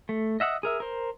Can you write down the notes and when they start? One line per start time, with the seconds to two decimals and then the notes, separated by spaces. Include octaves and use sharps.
0.09 A3
0.40 D#5 E5 F#5 D#6
0.63 G#4 A#4 E5
0.80 A#4 C5